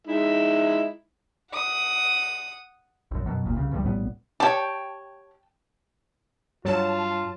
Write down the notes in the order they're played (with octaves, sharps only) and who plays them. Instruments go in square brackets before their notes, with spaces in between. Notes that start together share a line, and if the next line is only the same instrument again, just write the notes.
[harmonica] G#3 E4 E5 [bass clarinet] D#4
[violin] F#5 D#6
[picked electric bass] A#1 F#2
F#2 B2 F#3
G1 D#2 A#2
C2 C#3
C#2 G2 D#3 G3
A#1 A2 G3 B3
[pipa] G4 C#5 [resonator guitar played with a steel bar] G5 A5
[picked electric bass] G2 [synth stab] F#3 A5 [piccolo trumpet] F4